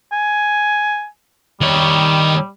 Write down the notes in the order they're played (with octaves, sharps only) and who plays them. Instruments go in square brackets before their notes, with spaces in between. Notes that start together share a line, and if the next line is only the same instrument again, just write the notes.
[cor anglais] G#5
[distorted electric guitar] D#3 C#5 [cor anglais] G3